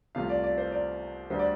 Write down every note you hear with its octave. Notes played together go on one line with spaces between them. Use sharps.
C2 C3 A3 F4 F5
D5
D5
C5
D5
D2 D3 G3 C5
D5